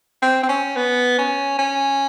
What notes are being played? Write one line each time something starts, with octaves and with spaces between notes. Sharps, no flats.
C4
C4
C#4
B3
C#4
C#4